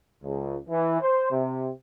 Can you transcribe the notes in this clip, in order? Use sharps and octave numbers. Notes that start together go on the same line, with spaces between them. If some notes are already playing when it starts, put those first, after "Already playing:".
C#2
E3
C5
C3